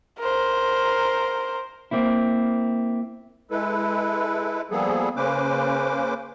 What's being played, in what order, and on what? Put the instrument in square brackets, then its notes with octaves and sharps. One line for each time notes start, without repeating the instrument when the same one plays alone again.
[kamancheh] A#4 C5
[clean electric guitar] A#3 C4 E4
[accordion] G#3 E4 A4 B4
F3 G3 A#3 B3 G#4 A4
C#3 A#3 C#4 B4 C5 D6